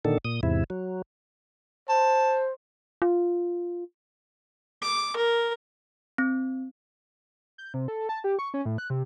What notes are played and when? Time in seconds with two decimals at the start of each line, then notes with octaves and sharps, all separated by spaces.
0.05 A#2 D3 D#3 A4
0.25 A#2 D#6
0.43 E2 G#2 C3 E4
0.70 F#3
1.89 C5 A5
3.02 F4
4.82 D6
5.16 A#4
6.18 C4
7.58 G6
7.74 C3
7.88 A4
8.09 A5
8.24 G4
8.39 C#6
8.54 C#4
8.66 A2
8.78 F#6
8.90 C3